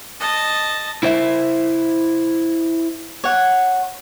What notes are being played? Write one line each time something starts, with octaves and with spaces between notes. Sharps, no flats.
D#5 A5
E4 C5 E5
C#5 F#5